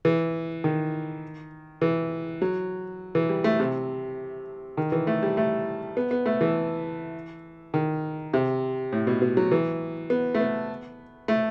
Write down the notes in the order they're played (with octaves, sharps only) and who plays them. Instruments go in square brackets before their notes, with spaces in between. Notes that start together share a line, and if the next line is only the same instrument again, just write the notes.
[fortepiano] E3
D#3
E3
F#3
E3
G3
A3
C3
D#3
E3
A3
G3
A3
B3
B3
A3
E3
D#3
C3
A2
B2
B2
F#3
E3
B3
A3
B3
A3